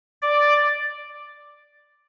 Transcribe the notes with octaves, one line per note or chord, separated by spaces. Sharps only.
D5